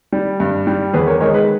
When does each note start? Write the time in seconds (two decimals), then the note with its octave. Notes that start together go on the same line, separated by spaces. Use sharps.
0.12 G3
0.40 G2
0.67 G3
0.93 E2 G#4 B4
1.07 A#4 C#5
1.20 D#3 G#3 A#4 C#5
1.34 G#4 B4